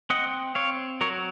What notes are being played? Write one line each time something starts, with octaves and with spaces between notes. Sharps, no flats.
C4 D#5 F#5
C4 C#5 F5
F#3 A#4 C#5